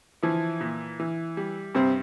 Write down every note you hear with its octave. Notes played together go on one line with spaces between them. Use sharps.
E3 F3 E4
A#2
E3
G3
G2 C3 C4